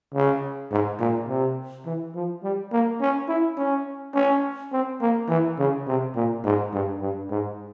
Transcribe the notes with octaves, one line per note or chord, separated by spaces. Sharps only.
C#3
G#2
A#2
C3
E3
F3
G3
A#3
C#4
E4
C#4
C#4
C4
A#3
E3
C#3
C3
A#2
G#2
G2
G2
G#2